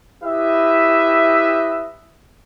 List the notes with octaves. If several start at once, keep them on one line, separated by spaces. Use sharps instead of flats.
E4 G4 B4 D#5 E5